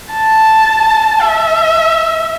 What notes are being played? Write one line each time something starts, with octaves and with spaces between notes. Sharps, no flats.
A5
E5